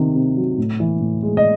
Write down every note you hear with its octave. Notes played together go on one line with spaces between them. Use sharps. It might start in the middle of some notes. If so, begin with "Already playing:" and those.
Already playing: C3 D#3
C3
F#3
A2
E3
A2
G#3
D#5